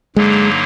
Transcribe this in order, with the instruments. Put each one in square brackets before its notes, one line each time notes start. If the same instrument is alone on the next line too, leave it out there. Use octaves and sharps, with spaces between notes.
[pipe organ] G2 D3 F#3 A#3 D#4 [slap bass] G#3